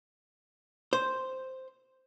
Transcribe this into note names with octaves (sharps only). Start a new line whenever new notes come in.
C5